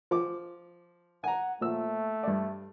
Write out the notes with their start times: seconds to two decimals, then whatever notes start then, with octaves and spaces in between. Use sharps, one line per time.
0.11 F3 D6
1.24 F#5 G#5 A#5
1.61 A#2 F3 A3 E6
2.23 G2 D5